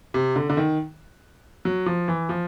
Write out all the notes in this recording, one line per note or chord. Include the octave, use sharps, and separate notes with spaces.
C3
D3
D3
D#3
F#3
F3
E3
F3